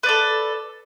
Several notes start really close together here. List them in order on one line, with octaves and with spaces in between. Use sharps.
B4 D5 A4